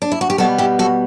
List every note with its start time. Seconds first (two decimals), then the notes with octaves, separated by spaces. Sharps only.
0.02 D4
0.12 E4
0.21 F#4
0.30 G4
0.38 B2 G3 B3 F#4 A4
0.58 E4 G4
0.79 F#4 A4